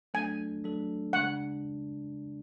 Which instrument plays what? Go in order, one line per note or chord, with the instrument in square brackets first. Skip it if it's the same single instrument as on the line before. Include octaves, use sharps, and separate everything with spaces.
[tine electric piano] F#3 A3 D4 A4 [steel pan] G#5
[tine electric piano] F#3 A3 D4 A4
[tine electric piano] C#3 G#3 D4 [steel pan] F#5